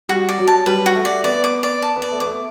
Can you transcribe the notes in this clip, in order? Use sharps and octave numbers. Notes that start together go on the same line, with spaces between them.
G3 F#4
D5
F#3
A5
G3 B4
F#4
A3
D5
B3 D5
D6
D5
A5
B3
D5
A3
B3 D6
A3